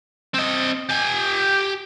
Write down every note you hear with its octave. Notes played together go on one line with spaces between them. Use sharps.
C4 D#5
G4 G#5